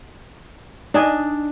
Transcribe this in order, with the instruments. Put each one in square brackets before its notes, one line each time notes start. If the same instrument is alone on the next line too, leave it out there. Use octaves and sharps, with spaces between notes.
[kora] D4 [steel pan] D#4 D#5 G#5